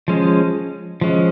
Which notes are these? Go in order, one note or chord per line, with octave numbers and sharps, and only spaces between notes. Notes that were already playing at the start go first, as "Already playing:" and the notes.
F3 G#3 C#4
F3 G#3 C#4